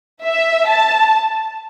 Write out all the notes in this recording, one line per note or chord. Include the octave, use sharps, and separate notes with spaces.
E5
A5